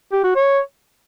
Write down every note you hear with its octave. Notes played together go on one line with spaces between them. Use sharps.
G4
F#4
C#5